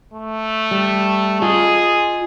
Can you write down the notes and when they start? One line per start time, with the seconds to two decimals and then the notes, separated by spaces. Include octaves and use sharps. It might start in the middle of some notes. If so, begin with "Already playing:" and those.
0.14 A3
0.71 G3
1.42 F4 G#4 D#5